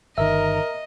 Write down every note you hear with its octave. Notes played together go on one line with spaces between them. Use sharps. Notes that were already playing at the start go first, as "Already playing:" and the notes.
G1 D#3 A#4 D#5 E5